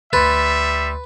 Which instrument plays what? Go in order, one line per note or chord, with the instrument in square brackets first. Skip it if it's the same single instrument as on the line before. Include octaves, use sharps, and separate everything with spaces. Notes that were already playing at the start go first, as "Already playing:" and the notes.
[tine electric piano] D2 C6 A6 [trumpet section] G3 E5 [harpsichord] B4